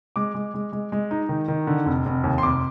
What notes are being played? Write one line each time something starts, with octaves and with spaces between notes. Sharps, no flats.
G#3 D6
G#3
G#3
G#3
G#3
D#4
D#3
D#3
D3
F1
F1
D#2
C6
F1 D6